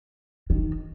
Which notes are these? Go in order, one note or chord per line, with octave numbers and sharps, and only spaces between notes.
D#3